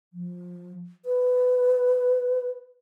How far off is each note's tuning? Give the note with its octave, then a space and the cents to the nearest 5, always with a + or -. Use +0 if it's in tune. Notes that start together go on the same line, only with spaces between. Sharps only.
F3 +20
B4 +15